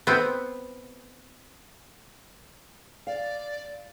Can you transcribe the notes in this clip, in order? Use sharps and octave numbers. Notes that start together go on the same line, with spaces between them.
B3 C4
D5 F5